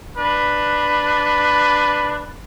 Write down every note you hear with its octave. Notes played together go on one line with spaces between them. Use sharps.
D4 B4